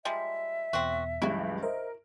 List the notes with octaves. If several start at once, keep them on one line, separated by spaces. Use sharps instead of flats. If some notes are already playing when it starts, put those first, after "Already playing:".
F3 G3 G#3 E5
E2 B2 C4 F#4
C#2 G2 E3 F#3 G3 E4 F#4
A#4 C5 D#5 E5